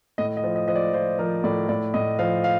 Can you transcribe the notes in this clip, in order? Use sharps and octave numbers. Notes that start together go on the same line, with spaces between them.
A2 D#5
D#5
F3
D#5
F3 D#5
D5
F3 C5
F3 A#4
A2 D5
A2 D5
A2 D#5
F3 F5
F5